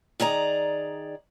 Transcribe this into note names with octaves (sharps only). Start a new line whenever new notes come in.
D#3 G#4 D5 A#5